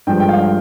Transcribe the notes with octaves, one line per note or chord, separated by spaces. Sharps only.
G2 F3 G#3 G5
G5
F5